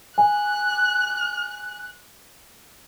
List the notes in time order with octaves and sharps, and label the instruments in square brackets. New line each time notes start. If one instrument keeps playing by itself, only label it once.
[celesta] G#5 [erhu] F#6